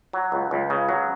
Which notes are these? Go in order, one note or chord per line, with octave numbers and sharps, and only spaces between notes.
F#3
C#2
C#2
C#3
F#3